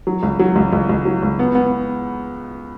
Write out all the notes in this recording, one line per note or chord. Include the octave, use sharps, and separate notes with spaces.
F#3
C#2
F#3
C#2
C#2
C#2
F#3
C#2
B3
B3